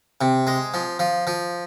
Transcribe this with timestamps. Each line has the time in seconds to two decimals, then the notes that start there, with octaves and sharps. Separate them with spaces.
0.21 C3
0.47 G#3
0.74 F3
0.99 F3
1.27 F3